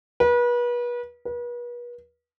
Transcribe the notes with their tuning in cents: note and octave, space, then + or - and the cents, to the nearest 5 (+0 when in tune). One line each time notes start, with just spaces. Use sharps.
B4 -35
B4 -40